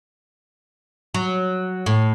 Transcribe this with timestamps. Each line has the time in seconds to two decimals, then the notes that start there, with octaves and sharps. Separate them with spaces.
1.14 F#3
1.86 A2